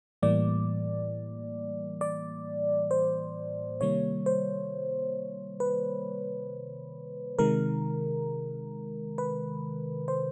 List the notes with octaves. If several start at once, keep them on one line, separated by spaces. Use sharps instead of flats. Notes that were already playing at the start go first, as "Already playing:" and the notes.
A2 E3 G3 A#3 D5
D5
C5
C3 D#3 G3 A#3 C#5
C5
B4
C3 D#3 G#3 A#4
B4
C5